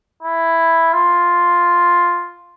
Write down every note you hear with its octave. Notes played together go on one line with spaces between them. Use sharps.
E4
F4